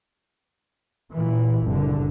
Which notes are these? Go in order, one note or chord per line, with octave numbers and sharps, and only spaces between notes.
A#2 E3
F#1 C2 D3